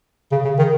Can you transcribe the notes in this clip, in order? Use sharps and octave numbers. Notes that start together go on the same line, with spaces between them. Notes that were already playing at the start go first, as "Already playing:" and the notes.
C#3
C#3
D#3